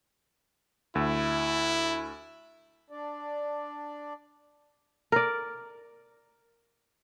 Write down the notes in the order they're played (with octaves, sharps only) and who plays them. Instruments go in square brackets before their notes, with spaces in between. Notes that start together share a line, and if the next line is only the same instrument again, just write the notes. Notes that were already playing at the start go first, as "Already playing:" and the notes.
[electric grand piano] D2 E6 [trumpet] E4
[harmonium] D4 D5
[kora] A#4 D5